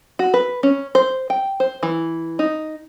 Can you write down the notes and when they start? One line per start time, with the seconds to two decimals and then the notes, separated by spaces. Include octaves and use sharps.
0.19 F#4
0.34 B4
0.63 C#4
0.95 C5
1.30 G5
1.60 C5
1.83 E3
2.39 D#4